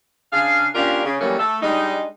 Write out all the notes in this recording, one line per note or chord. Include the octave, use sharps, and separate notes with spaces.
C#3 D4 G#4 F5
A#3 C#4 D4 F4 G4 A#4
C#3
E3 F#3 G3 A3 A#3 C#4
A3 A4
G3 G#3 D4 D#4